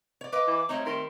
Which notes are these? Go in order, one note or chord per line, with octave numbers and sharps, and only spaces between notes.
C#5 D5
B4 D#5 F5 D6
E3
G3 A3 C4 D#4 C#5
D#3 C6